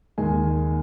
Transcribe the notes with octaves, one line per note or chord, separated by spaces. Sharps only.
D#2 D#3 G#3 G#5